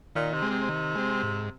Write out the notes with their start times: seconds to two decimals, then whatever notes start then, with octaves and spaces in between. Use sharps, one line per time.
0.15 A#2 D#3
0.33 C3
0.42 G#3 C4
0.51 C3
0.69 D#3
0.95 G#3 C4
1.23 G#2